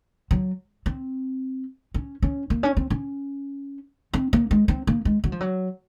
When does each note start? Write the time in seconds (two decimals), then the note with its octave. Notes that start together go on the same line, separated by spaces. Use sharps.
0.31 F#3
0.86 C4
1.94 C#4
2.22 C#4
2.50 A#3
2.63 C#4
2.77 C4
2.90 C#4
4.13 C4
4.33 A#3
4.51 G#3
4.68 C4
4.87 A#3
5.05 G#3
5.24 F#3
5.32 F3
5.41 F#3